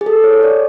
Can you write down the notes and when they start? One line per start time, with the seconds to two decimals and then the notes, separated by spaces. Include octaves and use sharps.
0.01 G#4
0.06 A4
0.24 C#5
0.43 D5